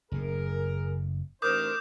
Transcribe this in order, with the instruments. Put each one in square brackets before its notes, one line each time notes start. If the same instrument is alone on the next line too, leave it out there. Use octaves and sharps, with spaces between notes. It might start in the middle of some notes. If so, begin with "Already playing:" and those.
[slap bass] F#1 A2 [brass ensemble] G#4 A#4
[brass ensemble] A1 D#4 C5 [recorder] A#4 [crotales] D6 D#6 G6